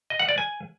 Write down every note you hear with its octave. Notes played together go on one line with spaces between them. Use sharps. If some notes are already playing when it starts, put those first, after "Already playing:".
D#5
F#5
D5
G#5